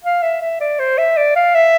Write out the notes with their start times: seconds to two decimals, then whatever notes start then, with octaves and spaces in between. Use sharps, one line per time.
0.04 F5
0.23 E5
0.42 E5
0.60 D5
0.79 C5
0.98 E5
1.17 D5
1.36 F5
1.55 E5